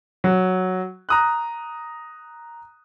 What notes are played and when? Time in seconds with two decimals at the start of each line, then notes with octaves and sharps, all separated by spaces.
0.24 F#3
1.09 A#5 D#6 F#6